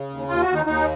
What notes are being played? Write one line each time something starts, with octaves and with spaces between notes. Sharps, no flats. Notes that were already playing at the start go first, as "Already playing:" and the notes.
Already playing: C#3
D#2
D#2 F4
F#4
D#2
D#4
D#2 D#4